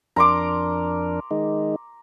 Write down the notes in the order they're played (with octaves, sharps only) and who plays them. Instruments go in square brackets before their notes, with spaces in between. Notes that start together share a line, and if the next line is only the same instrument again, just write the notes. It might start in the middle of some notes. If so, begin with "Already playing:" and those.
[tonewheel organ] F2 D4 A#4 [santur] A#5 C6 D6
[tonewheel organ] D#3 G#3 D#4